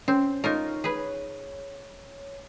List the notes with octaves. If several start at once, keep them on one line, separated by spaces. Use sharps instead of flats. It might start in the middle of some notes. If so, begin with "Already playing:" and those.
C4 C#4
D#4 F4 A#4 C#5
G#4 B4